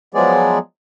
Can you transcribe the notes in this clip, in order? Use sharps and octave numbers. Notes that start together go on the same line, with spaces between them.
F3 F#3 G#3 B3 G#4 D5